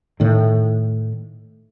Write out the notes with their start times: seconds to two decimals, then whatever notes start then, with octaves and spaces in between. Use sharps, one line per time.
0.20 A2 D#3